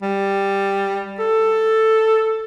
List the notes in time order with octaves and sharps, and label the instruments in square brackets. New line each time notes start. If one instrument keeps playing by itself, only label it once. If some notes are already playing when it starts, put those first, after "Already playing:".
[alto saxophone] G3
A4